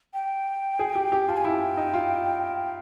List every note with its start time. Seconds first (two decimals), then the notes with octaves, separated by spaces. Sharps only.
0.14 G5
0.79 G#4
0.95 G4
1.12 G4
1.28 F4 A5
1.37 G#5
1.45 E4 G5
1.77 D#4
1.94 F4